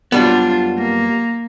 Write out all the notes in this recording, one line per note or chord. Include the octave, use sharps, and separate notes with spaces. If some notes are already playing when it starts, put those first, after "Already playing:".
F#2 G3 B3 D4 F4
A#3